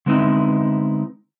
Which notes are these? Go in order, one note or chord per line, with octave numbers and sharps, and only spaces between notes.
D3 G#3 B3 C4 D#4 E4